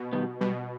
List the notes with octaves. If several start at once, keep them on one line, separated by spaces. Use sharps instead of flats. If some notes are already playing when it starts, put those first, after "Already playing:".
Already playing: B2
D#3 G3 B3
B2 G3